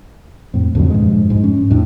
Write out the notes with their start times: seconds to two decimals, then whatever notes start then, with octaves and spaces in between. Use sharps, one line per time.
0.54 F2 A2
0.75 F2 D3 F3 F#3
0.90 G2 A#2 F3 G#3
1.30 G#2 G#3
1.44 C#4
1.70 F2 A2 D4